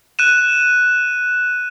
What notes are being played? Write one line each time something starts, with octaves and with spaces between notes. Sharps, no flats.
F#6 D#7 E7